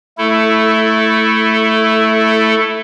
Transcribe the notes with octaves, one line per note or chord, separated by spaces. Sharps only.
A3 E4 A4